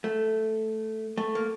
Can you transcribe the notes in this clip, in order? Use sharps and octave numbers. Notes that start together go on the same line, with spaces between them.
A3
A3
A#3